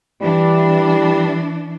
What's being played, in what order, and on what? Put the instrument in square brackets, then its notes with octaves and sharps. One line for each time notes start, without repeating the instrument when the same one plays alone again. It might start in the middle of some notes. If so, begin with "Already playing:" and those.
[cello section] E3 D4 [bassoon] G3